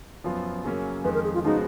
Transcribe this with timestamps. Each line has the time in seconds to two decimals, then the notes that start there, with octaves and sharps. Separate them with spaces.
0.24 F#2 F3 B3 F4
0.64 F#2 C#3 F#3 A#3 C#4
1.04 F2 D#3 G#3 B4
1.14 A#4
1.24 G#4
1.34 F4
1.44 C#3 F3 G#3 B3 D#4 F#4